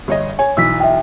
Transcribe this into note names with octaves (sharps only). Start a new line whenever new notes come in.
G1 C#5 D#5
C#5 G#5
B1 E3 E6 B6
E5 G5